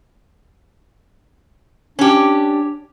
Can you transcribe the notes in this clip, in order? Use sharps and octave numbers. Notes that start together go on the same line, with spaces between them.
C#4 D4 G4